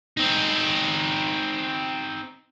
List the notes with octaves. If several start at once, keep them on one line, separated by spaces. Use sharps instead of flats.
C4 D#4